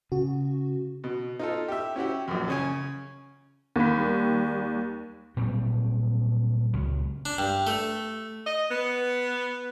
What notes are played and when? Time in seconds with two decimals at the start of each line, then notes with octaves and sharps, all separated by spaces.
0.12 C#3 F#4
1.04 B2
1.39 D#4 F4 A4
1.68 G4 E5
1.96 C#4 E4 F#4 G4
2.28 A#1 F#2
2.48 C#3 C#4 G#5
3.76 D#2 B5
3.96 G3
5.37 A#2 F#3 G3 C4
6.73 C#2 F#3
7.26 D4
7.38 G2
7.67 A3
8.47 D#5
8.71 B3